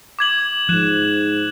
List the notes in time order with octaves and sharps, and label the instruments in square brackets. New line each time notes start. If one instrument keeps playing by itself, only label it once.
[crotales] D6 G#6 F#7
[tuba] G#2 [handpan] F3 [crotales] F#6 E7